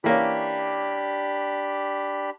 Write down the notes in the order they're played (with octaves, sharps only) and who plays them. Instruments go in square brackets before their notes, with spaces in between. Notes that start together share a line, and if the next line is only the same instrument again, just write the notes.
[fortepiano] E3 A#3 C#4 [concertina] D4 G4 B5